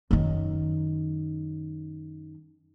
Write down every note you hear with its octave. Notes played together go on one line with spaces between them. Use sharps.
F#2 D#3